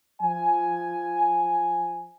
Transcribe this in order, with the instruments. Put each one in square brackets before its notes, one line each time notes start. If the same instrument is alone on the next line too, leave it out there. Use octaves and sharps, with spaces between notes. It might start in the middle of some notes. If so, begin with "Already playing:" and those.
[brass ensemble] F3 G#5